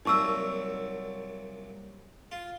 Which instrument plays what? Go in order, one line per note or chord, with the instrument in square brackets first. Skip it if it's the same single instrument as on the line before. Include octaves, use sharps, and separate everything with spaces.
[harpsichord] C2 A#2 F#3 [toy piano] D#4 C#6 E6
[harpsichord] F4